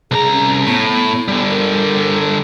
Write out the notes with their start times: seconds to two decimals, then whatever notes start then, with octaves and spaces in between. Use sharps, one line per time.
0.11 C2 G#4 A#5
0.31 C#4
0.67 A2 B3
1.28 D3 G3
1.49 A#4